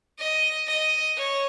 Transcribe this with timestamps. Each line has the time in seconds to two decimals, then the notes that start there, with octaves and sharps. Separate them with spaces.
0.19 D#5
0.68 D#5
1.17 C#5